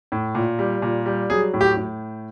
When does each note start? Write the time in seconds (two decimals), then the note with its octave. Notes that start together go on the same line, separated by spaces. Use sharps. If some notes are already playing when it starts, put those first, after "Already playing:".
0.12 A2
0.35 A#2
0.59 G3
0.82 A#2
1.06 G3
1.30 F#3 G#4
1.54 A2
1.61 G4
1.77 A2